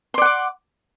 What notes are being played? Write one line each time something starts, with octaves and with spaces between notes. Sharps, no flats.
D5 F#5 C6 D6